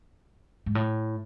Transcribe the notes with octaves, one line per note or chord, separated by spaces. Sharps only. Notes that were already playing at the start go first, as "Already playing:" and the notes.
G#2
A2